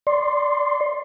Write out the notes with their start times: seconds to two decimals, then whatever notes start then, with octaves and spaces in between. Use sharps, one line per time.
0.07 D5 C6